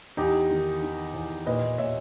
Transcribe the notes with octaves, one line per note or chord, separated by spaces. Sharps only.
E2 D#4 G4
D#3
D#3
E2
A#2 B4 D#5
A#2 C#5 E5